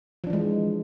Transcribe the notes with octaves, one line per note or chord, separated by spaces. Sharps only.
E3 F3 G#3 D4